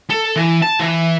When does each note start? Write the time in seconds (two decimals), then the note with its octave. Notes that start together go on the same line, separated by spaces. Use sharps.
0.10 A4
0.36 E3
0.62 A5
0.80 E3